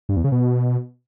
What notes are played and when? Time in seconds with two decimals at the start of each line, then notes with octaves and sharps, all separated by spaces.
0.09 G2
0.17 E2
0.24 C#3
0.32 B2